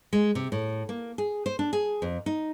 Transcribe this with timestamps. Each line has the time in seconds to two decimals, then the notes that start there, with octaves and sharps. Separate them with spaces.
0.13 G#3
0.35 C3
0.52 A2
0.89 A#3
1.18 G#4
1.46 C5
1.59 D4
1.73 G#4
2.02 F2
2.26 D#4